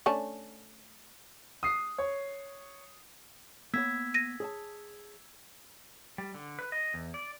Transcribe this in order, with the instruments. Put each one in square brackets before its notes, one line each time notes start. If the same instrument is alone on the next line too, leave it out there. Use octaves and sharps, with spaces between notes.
[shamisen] A3 C#4 D4
[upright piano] D#6 C7
C#5
[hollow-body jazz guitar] A#3 B3 C#5 [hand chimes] E6 G#6 B6
[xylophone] A#6 D#7
[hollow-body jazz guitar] G#4 C#5 A5
[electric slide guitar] G3
D3
B4
D#5
E2
D5